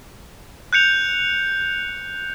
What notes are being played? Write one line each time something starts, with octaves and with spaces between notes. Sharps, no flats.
F#6 G6 C#7 F7